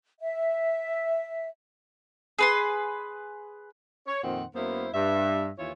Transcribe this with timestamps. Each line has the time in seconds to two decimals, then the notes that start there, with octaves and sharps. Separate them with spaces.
0.20 E5
2.39 G#4 B4 C6
4.07 C#5
4.23 F2 A#2 D#3 C4 C5 F#5
4.55 F#2 A#3 B3 E4 C5
4.94 G2 E5
5.58 D#2 E3 E4 F4 C#5